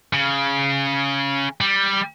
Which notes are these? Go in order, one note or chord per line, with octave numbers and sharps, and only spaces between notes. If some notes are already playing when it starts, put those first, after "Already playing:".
C#3
G3